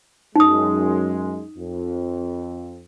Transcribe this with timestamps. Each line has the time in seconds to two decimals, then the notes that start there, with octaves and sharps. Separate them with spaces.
0.36 F#2 G#3 D#4 D#6
1.57 F2